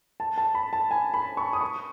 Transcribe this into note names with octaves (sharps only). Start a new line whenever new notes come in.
A5
A5
B5
A5
G#5
B5
C#6
D#6
C#6